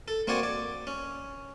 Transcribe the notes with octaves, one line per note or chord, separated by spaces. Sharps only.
A4
A#3 C4 F#4 D5 F#5 G#5
D5
C#4